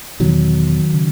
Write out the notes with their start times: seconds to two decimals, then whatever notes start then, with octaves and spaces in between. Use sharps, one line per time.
0.20 E2 B2 D#3 F#3
0.94 C#3